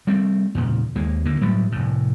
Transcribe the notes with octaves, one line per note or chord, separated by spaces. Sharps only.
G3 A3 C4
E2 A#2 C#3
D#2 G#3 A#3
D3 A#3
A2 F#3 G3
F1 A2